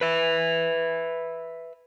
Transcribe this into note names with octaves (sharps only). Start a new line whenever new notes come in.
B4 E5